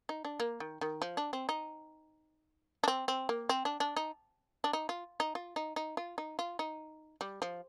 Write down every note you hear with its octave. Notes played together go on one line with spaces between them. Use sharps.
D#4
D4
A#3
D#3
D#3
F3
D4
C4
D#4
D4
C4
C4
A#3
C4
D4
D4
D#4
D4
D#4
F4
D#4
F4
D#4
D#4
F4
D#4
F4
D#4
G3
F3